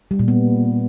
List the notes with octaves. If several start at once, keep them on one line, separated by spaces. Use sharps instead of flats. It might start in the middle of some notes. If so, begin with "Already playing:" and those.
G3
A#2
B3